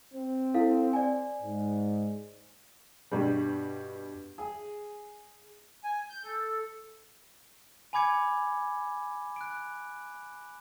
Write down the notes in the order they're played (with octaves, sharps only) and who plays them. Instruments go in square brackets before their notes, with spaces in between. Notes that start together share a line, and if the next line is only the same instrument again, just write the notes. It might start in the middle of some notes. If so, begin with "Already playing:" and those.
[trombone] C4
[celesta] E4 A4 F5
D5 G#5
[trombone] G#2
[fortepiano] G2 B2 G3
G#4
[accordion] G#5
G6
A4
[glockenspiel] G#5 B5 D6 G#6 C#7
F#6 D7